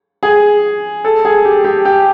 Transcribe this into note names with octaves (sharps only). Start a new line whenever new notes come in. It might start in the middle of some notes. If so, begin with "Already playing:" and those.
G#4
A4
G#4
G4
G4
G4